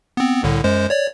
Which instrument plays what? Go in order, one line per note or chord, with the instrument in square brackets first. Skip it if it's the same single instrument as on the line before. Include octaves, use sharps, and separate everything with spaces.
[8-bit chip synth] B3 C4
C2 A2 D3
F#2 G#3 C5
C#5 D5